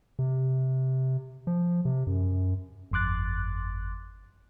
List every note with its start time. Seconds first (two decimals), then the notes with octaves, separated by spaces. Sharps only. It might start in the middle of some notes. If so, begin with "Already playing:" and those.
0.19 C3
1.47 F3
1.85 C3
2.07 F#2
2.91 G1 F2 C6 D6 F#6 A6